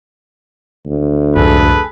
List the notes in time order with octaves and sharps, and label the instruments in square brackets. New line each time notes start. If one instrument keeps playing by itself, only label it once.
[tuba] D2
[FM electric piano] C2 F2 G#2 [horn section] G#4 A4 B4